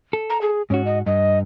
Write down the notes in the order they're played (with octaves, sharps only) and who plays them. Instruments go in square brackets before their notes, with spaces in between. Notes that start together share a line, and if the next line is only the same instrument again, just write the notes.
[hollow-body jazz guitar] A4
[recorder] A#5
G#4
[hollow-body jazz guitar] G#2 F#4 [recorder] C#4
[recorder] D#5
[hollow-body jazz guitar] G2 [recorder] D#5